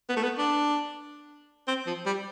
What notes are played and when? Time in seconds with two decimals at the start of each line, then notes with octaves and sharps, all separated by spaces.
0.09 B3
0.16 A3
0.23 B3
0.38 D4
1.67 C4
1.87 F3
2.06 G3